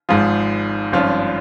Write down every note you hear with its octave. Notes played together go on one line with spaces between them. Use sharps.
G#1 G#2 F3 F4 G#4
G#1 G2 F3 C#4 F4